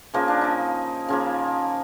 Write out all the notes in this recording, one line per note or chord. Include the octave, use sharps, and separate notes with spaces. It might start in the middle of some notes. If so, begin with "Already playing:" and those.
C#3 F3 A#3 D#4
D4
D#4
C#3 F3 A#3